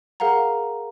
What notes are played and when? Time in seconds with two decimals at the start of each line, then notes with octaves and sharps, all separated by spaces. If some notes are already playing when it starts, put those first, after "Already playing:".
0.20 G#4 A#4 F5 F#5 A#5